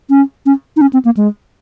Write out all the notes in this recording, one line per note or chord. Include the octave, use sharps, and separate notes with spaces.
C#4
C#4
D#4
C#4
C4
A#3
G#3